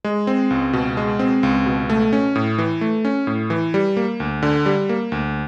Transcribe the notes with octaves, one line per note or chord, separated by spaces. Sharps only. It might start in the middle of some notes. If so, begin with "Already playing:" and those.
G#3
C4
C#2
B2
G#3
C4
C#2
B2
A3
C#4
A2
E3
A3
C#4
A2
E3
G3
A#3
D2
D3
G3
A#3
D2